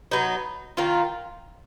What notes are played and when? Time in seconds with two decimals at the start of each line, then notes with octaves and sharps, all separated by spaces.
0.11 F#3 B3 D#4
0.77 D#3 A#3 F4